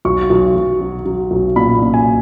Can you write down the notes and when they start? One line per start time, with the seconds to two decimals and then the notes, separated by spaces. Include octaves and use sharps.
0.05 B1 C#6
0.30 B1
0.56 B1
0.81 F#3
1.06 F#3
1.31 B1
1.56 A#2 B5
1.82 A#2
1.94 G#5